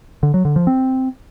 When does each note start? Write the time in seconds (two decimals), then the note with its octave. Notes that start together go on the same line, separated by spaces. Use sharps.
0.23 D3
0.34 F#3
0.45 D3
0.56 F3
0.67 C4